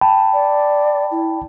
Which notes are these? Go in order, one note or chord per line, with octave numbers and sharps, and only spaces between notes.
G5 A5 B5
D5
E4